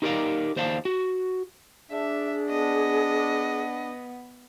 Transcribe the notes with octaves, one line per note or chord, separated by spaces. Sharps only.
D#4 G4 A#4 C#5 D5 F5
D#2 C5 D5 F5 A5
F#4
D4 G#4 E5
B3 D#5